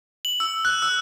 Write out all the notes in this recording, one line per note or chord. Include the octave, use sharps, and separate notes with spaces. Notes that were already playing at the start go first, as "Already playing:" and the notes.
F#7
E6
F#6
E6